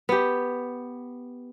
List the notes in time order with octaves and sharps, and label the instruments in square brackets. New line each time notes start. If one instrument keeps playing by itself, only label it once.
[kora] B3 G4